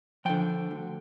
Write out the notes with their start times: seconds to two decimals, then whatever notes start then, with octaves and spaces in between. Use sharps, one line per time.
0.25 D3 F3 G5
0.71 D2